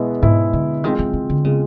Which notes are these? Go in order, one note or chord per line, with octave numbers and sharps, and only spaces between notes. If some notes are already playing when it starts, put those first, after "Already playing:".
Already playing: B2 G#3 B3 E4
G#2 B2 G#3 B3 E4
D3
D#3 G#3 C4 F4 G#4
E3
D#3
D3
C#3 G#3 C4 F4 G#4